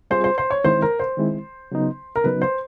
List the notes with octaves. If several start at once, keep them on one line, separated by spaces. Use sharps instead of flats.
G3 C4 F4 G#4 C5
C5
C5
C#5
D#3 G#3 C4 E4 C5
A#4
C5
D#3 G#3 C4 E4
C#3 F#3 B3 D#4
A#4
C#3 F#3 B3 D#4 B4
C5